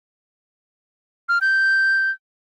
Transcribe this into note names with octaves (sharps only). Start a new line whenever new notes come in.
F6
G6